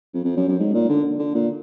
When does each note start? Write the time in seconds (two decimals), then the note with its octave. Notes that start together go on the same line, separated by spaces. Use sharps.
0.14 F2
0.24 F2
0.36 F#2
0.48 F#2
0.59 G#2
0.74 A#2
0.89 D3
1.19 D3
1.34 A#2